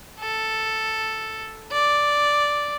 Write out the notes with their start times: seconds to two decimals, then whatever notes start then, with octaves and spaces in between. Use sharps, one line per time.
0.19 A4
1.72 D5